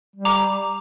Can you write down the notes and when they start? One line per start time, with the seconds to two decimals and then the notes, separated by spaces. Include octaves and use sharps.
0.16 G3
0.25 A#5 D6